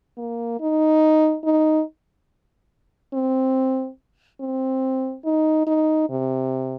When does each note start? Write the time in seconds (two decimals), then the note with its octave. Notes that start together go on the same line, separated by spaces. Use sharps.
0.17 A#3
0.61 D#4
1.45 D#4
3.14 C4
4.40 C4
5.25 D#4
5.67 D#4
6.10 C3